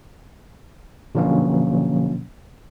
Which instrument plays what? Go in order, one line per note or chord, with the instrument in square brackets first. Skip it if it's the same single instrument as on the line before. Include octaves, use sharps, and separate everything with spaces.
[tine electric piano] B2 D3 F3 F#3 A#3 C#4